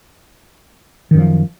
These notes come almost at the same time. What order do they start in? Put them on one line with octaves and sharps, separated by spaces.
D#3 F#2 F3